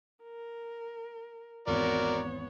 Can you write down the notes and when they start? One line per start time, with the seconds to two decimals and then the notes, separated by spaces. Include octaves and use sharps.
0.23 A#4
1.67 G#1 E2 B3 F#4 A#4 C#5 D5